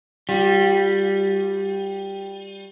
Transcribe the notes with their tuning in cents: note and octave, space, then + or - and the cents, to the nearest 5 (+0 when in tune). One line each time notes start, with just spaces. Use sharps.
G3 +0 F4 +40